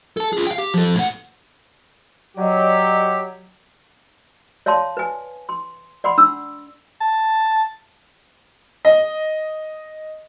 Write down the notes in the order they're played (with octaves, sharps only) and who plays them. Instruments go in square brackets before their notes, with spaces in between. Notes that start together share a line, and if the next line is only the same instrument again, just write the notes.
[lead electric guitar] A4 A5
F4 G#4
F5 G5
G4
F3 A4
A2 F#5
[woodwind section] F#3 [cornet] G4 [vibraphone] D5 D#5
[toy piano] C#5 D5 F5 A5 C6
B4 G#5
C6
D5 F#5 B5 C6
D4 E6
[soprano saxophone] A5
[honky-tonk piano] D#5